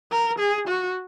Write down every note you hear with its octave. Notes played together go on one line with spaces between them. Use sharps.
A#4
G#4
F#4